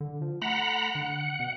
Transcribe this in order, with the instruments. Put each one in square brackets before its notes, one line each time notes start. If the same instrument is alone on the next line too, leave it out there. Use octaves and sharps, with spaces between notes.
[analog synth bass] D3
F3
[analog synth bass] A3 [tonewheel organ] F#5 A#5 B5
[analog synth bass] D3 [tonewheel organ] F#5
[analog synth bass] B2